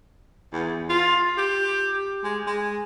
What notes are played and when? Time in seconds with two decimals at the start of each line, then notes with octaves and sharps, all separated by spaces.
0.52 E2
0.89 F4
1.38 G4
2.24 G#3
2.47 G#3